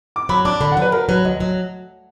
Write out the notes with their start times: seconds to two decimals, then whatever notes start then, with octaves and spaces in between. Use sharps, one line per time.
0.16 D6
0.29 F#3 B5
0.45 D4 D6
0.61 D3 B5
0.72 F#5
0.77 F#3 B4
0.92 F#3 A#4
1.09 F#3 B4
1.25 D2 D#5
1.40 F#3